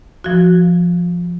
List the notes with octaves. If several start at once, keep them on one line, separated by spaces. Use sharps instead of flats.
F3 F#4